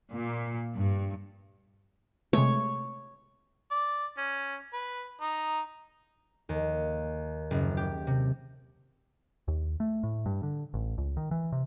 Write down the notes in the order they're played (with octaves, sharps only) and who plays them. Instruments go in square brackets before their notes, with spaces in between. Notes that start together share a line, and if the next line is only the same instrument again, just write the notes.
[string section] A#2
G2
[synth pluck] C3 G#3 A3 [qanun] C#5
[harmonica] D5
C#4
B4
D#4
[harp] D#2
F#1
G4
C3
[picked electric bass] D#2
A3
A2
G2
D3
A1
C#2
D#3
E3
C3